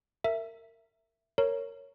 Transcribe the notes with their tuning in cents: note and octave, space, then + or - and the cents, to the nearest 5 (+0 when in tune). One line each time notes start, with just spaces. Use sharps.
A#4 -25 E5 +10
A#4 -10 C#5 +0 A#5 +0